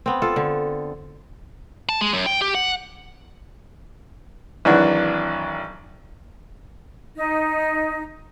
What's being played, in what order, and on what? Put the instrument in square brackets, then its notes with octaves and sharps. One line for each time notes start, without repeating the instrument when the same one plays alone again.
[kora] B3 C4
F4 A4
D3
[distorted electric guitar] A5
G#3
F#2
G5
G4
F#5
[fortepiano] G#1 E3 F#3 D4 F#4
[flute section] D#4